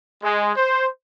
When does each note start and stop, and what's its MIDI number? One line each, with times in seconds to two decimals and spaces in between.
0.23 0.54 56
0.56 0.88 72